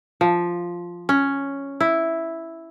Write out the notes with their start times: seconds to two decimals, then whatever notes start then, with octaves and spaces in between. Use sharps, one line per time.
0.21 F3
1.09 C#4
1.80 E4